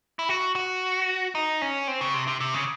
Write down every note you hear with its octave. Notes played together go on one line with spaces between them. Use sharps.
E4
F#4
F#4
D#4
C#4
C4
C#3
C3
C3
C3
C#3